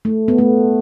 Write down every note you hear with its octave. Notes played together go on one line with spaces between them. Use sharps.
A3
B3
A3